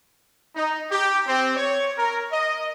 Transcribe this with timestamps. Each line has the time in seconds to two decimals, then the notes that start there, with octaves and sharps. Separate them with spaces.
0.56 D#4
0.91 G4
1.27 C4
1.57 C#5
1.98 A#4
2.32 D#5